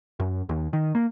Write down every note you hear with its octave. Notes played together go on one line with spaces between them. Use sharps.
F#2
D#2
D#3
A#3